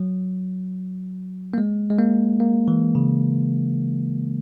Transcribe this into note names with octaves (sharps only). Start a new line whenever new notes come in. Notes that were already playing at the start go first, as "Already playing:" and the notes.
Already playing: F#3
A#3
G#3
G#3
A#3
A#3
E3
C#3